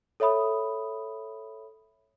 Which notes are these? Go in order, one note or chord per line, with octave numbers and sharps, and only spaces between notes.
A4 C#5 E5 B5 D#6